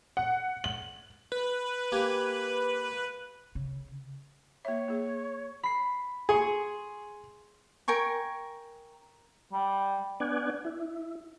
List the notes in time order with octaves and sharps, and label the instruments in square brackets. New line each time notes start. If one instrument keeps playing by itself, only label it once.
[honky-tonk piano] F#5
F#7
[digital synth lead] B4
[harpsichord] A#3 G4 G#5
[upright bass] C#3
[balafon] A#3 E5 [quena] C#5
[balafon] A#3 G#4
[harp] B5 C7
[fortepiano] G#4 [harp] C6 C#6
[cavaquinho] A#4 G5 G#5 C#6
[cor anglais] G3
[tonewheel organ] B3 D4 D5 F#5 G#5
E4